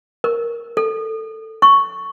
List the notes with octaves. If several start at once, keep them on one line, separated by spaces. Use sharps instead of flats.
A#4
A4
C#6